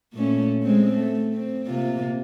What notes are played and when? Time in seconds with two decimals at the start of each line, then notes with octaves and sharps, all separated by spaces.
0.13 A#2 A3 C#4
0.62 G#3 C4
0.94 A3
1.34 C4
1.68 C3 A#3 F4